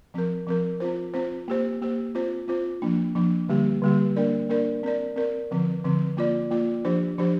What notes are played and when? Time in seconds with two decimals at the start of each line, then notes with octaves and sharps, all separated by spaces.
0.14 F3 C4 A#4
0.47 F3 C4 A#4
0.80 C4 F4 C5
1.14 C4 F4 C5
1.48 A#3 G4 C5
1.82 A#3 G4 C5
2.15 C4 F4 C5
2.48 C4 F4 C5
2.82 F3 A#3 D4
3.15 F3 A#3 D4
3.48 D3 G3 A#3 G4
3.82 D3 G3 A#3 G4
4.16 A#3 D4 A#4 D5
4.49 A#3 D4 A#4 D5
4.83 C4 A#4 D5
5.16 C4 A#4 D5
5.51 D3 F3 C4
5.84 D3 F3 C4
6.17 A#3 F4 D5
6.51 A#3 F4 D5
6.85 F3 D4 G4 C5
7.18 F3 D4 G4 C5